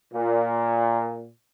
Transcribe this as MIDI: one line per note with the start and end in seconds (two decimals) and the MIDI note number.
0.13 1.28 46